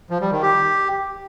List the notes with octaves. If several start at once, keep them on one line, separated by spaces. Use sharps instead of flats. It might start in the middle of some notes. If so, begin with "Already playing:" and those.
F3
G3
D#3
G4